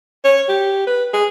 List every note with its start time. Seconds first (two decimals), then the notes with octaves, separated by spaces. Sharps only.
0.24 C#5
0.49 G4
0.87 B4
1.13 G#4